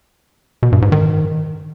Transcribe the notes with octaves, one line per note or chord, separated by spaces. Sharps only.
B2
G2
G#2
D#3